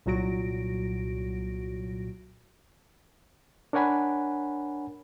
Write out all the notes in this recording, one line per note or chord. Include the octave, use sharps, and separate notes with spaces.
C2 A#2 F#3 F#4 A#6 D7
D4 A#4 C#5 F#5 G#5 B5